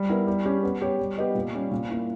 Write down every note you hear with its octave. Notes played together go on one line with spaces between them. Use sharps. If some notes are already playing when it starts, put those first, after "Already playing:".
Already playing: G3
B3 E4 A#4
G3
C#4 G4
B3
G4 C#5
G3
B3 G4 B4 D#5
A#2
G3 C#4
A#2
A#3 E4